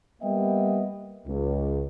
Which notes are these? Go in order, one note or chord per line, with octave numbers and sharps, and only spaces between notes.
G3 A#3 B3 D#5 E5 G5
C#2